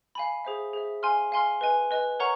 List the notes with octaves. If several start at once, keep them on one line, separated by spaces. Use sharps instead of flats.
F5 G#5 B5
G#4 C5 E5
G#4 C5 E5
F5 G#5 C6 F6
F5 G#5 C6 F6
B4 D#5 G#5
B4 D#5 G#5
A#4 C#5 F#5 A#5 C#6